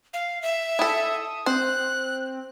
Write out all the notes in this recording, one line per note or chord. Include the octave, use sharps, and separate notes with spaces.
F5
E5
E4 A4 D#6
C4 C5 F#6